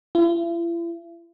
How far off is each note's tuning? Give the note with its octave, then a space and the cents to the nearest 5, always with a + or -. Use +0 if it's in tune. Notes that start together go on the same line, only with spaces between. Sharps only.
E4 +45